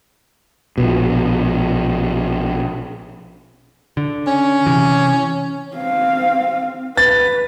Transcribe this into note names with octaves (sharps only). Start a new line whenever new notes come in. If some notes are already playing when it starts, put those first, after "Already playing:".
A#1 B2
D3
C#4
C3 E3
C4 F5
B4 A6